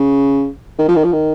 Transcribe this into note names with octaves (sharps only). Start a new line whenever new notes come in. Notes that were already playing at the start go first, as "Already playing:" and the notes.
Already playing: C#3
D#3
F3
D#3
F3
D#3